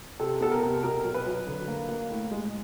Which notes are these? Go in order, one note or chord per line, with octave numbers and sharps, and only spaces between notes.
C3 A4
B3 A4
A#4
C3
B2 A#4
F#3
B4
F#3
D3
A#3
A#3
A2
G#3